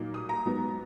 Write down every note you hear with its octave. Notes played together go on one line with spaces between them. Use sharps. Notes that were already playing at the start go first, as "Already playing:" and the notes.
Already playing: A#2 F#3 A#3 D#4
D#6
A#5
G#2 F#3 B3